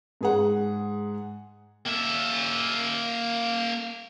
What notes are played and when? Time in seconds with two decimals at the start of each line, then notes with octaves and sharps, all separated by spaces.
0.21 G#2 G#4 F#5
1.86 A#3 E5